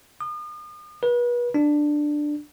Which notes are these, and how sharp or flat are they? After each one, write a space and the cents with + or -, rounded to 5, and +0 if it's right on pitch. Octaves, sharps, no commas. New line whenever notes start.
D#6 -40
B4 -35
D4 +10